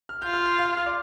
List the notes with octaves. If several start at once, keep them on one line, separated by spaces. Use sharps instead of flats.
F6
F4 G6
F6
G6
F5 F6
F6
D5 D6